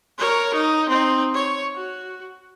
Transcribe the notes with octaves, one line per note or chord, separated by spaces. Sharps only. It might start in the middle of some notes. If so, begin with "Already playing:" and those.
A#4 C#5
D#4
C4 D#4
C#5
F#4